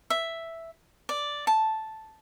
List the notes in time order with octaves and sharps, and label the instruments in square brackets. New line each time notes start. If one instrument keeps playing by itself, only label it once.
[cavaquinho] E5
D5
A5